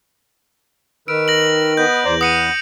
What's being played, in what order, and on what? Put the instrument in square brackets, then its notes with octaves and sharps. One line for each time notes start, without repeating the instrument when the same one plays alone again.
[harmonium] D#3 [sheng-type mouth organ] B4 E6 F6 [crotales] D7
[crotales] A#6 F#7
[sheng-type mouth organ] B3 B4 D#5 [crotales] G6
[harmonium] E2 [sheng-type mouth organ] C5 D5 A#5
[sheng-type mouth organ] B4 F#5 [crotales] D#6 C#7 D#7